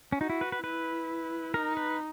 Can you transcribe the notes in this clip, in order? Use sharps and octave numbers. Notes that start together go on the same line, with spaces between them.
C#4
D#4 F#4
E4
B4
B4
E4 B4
D#4 A#4
B4